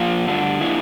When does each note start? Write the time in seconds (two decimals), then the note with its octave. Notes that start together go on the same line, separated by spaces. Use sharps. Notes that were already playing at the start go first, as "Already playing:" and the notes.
Already playing: F3 A#3 F4
0.26 G2 D3 A3 D4
0.61 F3 A#3 D4 E4